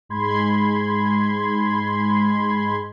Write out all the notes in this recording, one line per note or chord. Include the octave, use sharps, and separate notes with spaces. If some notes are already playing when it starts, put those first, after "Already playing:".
G#2 G#3 B5 C6 G#6